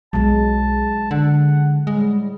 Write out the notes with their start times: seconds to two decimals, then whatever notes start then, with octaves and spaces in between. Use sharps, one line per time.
0.13 B1 F#3 G#3 A5
1.11 D3 F#5
1.87 A2 G3 G#3